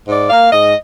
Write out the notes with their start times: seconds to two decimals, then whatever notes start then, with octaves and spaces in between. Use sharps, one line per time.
0.08 G#2 D5
0.30 A#3 F5
0.52 G#2 D#5